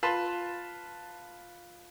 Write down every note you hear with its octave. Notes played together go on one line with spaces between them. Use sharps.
F4 B4 A5 C6